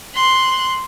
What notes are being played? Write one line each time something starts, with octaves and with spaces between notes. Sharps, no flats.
C6 F#6